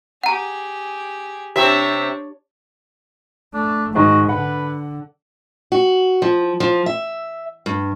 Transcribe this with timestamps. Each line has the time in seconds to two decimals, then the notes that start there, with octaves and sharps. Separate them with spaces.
0.24 G4 G#4 F#5 A#5
1.56 C3 C4 D4 G4 C#5 E5
3.54 A3 D4
3.95 G#2 D#3 F#4 D#5 A#5
4.29 D3 B4 F#5
5.72 F#4
6.22 F3
6.60 F3
6.86 E5
7.66 G2